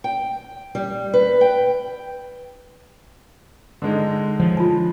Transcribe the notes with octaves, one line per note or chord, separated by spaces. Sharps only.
G5
G3
B4
G5
D3 G#3 D#4
F3 C#5
F4 A5